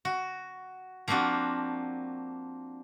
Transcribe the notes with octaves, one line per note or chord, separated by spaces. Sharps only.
F#4
F3 A#3 C4 D4 F#4